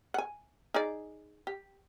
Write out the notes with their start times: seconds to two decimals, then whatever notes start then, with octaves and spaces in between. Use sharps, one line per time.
0.14 F#5 G#5
0.74 D#4 G#4 D5
1.47 G4